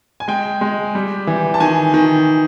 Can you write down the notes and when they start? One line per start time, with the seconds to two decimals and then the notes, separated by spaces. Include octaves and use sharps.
0.20 G#5
0.28 G#3 G5
0.61 G#3
0.95 G3
1.27 E3
1.54 A5
1.60 D#3 G#5
1.94 D#3